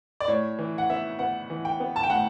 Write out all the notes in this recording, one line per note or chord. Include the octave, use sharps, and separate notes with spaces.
D5
A2 C#5
E3
F#5
B3 E5
B3 F#5
E3
G5
B3
A5
G5
A2 F#5